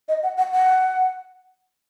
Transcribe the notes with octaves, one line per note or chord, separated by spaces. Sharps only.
D#5
F#5
F#5
F#5